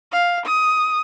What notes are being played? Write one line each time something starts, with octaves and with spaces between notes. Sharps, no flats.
F5
D#6